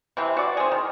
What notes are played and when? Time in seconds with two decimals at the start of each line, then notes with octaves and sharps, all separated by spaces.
0.17 C3 E3 C4
0.37 F#4 D5
0.57 C4 G#4
0.72 D#3